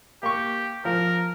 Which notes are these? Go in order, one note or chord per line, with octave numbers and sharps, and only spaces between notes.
A#3 G4 C#6
F3 A#4